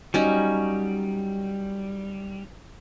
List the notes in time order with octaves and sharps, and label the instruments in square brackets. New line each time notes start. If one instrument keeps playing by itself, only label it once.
[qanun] F#3 C#4 D#4 [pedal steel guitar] G3